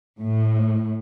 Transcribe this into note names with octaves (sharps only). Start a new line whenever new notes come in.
A2